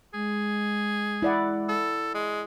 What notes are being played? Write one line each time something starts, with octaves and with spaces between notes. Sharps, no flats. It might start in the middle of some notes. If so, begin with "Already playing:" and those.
G#3 G#4
E4 D5 F#5
A4
G#3